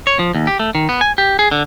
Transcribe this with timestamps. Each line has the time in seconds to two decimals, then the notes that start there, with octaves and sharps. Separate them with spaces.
0.07 C#5
0.19 F3
0.35 D#2
0.47 G4
0.60 A3
0.75 D#3
0.89 B3
1.01 G#5
1.18 G4
1.39 G#4
1.51 D3